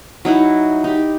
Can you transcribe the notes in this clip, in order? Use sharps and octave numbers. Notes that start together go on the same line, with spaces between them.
F#3 D#4 E4 F#5
D#4 G4